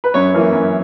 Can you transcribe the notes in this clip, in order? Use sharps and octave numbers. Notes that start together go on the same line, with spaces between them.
B4
F#2 C#5
E3 A#3 C#4 E4
F#2